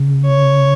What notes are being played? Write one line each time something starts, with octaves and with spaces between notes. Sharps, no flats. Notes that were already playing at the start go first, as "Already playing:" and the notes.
Already playing: C#3
C#5